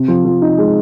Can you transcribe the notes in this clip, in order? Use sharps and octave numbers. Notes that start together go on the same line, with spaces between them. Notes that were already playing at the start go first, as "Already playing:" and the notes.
Already playing: C3
F3
F3
D#4
G#3